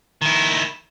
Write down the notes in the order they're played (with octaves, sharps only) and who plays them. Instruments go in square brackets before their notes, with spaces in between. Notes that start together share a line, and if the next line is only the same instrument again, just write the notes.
[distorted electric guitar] D#3 E4